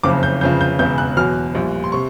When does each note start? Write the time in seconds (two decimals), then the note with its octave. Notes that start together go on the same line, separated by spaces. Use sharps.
0.03 F#1 F2 C#3 F3 D6
0.23 G6
0.41 G1 F2 C#3 G6
0.61 G6
0.79 E1 E2 C#3 G6
0.98 F#6
1.17 E2 B2 F#3 F6
1.55 A#1 A#2 G3
1.84 C6
1.92 C3 C#6